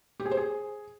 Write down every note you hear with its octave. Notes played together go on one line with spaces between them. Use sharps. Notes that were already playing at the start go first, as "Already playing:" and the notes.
G4
G#4
C5
G#4